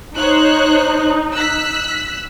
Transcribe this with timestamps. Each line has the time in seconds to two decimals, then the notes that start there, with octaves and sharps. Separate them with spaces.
0.17 D#4 C5 C#5 F#6
1.33 E6 F#6 B6